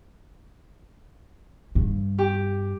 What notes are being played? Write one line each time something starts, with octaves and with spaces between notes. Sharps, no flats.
G2
G4